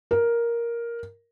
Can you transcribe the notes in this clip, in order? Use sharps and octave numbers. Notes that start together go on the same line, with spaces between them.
A#4